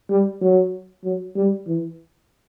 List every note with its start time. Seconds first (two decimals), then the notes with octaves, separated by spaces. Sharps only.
0.10 G3
0.42 F#3
1.04 F#3
1.36 G3
1.67 E3